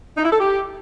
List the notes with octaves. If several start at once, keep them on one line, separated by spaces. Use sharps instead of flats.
D#4
E4
A4
G4